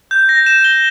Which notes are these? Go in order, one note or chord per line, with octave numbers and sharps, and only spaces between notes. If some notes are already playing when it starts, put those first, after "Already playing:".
G6
A#6
E7
G7